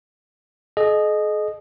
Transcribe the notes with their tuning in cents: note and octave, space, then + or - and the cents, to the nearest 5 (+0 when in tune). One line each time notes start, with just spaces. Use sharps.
G#4 +45 D#5 -15